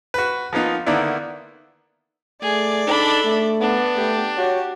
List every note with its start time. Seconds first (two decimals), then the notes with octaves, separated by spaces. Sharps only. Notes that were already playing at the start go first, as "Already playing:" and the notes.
0.14 F#4 B4
0.53 F3 A#3 B3 D#4 F4
0.86 D3 D#3 A#3 B3 D4 E4
2.43 A3 G#4 D5
2.87 D4 D#4 A4 B5
3.25 A3
3.61 B3 D4
3.96 A3 G4
4.37 F#4 G4 C#5